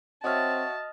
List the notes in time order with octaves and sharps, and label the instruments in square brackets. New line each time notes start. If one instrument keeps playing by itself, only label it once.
[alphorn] C4 [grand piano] F#4 C#5 E5 [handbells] D#5 D#6 F6 [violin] A5